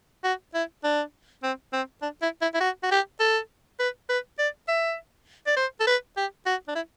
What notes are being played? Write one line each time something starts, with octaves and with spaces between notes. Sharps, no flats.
F#4
E4
D4
C4
C4
D4
E4
E4
E4
F#4
F#4
G4
A4
B4
B4
D5
E5
D5
C5
A4
B4
G4
F#4
D4
E4